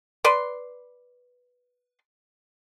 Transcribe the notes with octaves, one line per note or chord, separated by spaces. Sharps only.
B4 D5 C6